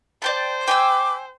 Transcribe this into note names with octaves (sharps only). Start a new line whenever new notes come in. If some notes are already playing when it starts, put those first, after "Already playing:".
C5 D5 G5 A5
G5 G#5 D6 E6